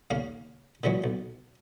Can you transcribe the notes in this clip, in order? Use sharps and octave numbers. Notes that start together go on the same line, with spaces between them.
D#2 C#3 A#3 F5
A#2 C#3 E3 F#3 G#3
B1